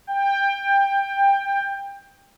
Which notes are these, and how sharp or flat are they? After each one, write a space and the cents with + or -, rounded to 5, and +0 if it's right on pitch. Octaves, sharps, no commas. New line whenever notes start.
G5 +20